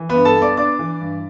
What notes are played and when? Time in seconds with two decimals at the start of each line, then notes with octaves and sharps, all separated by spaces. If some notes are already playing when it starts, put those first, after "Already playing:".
Already playing: E3
0.09 B3 B4
0.15 G2
0.25 A4 A5
0.36 B3
0.42 D5 D6
0.57 D4 D5 D6
0.79 E3
1.01 G2